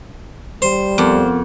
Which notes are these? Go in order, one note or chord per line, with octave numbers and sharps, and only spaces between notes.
G3 C5
F2 B3 A#4 D6